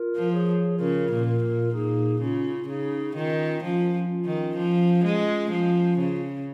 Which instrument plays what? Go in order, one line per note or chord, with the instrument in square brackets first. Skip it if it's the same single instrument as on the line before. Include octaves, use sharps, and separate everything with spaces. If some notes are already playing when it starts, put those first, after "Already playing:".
Already playing: [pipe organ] F4 A#4
[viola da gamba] F3
[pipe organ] G#4 C#5
[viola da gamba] C#3 [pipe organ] F4 A#4
[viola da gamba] A#2
[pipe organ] F4 A#4
[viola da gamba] A#2
[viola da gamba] A#2 [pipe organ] D#4 G#4
[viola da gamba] C#3 [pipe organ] C#4 F4
[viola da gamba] C#3 [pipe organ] D#4 G#4
[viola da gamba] D#3 [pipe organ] C#4 F4
[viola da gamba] F3 [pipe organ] C#4 F4
[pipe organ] C#4 F4
[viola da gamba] D#3
F3
G#3
F3
C#3